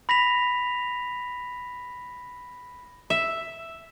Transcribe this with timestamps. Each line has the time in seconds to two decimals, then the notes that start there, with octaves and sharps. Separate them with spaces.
0.09 B5 A#6 B6 F7
3.10 E5